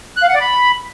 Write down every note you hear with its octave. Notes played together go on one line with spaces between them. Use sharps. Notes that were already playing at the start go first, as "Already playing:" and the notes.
F#6
F5
F#5
D5
B5